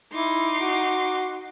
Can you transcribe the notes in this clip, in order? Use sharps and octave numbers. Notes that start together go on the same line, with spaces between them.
D#4 E4 C6 D6
F#4